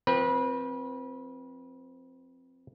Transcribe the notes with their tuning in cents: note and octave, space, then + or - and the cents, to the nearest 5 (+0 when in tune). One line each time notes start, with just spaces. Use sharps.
F3 +0 C4 +0 B4 -30